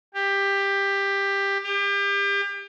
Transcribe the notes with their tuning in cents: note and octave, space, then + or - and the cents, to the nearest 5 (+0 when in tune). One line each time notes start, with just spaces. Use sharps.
G4 +15
G4 +35